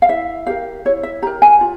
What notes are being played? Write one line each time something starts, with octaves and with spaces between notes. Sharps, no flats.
F5
E4 E5
G4 A#4 F5
E4 C#5
E5
G4 A#4 A#5
G#5
F4